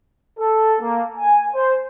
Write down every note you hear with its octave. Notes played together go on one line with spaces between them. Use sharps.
A4
A#3
G#5
C5